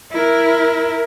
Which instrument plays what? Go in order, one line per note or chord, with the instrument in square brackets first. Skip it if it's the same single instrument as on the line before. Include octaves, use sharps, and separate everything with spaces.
[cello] E4 A#4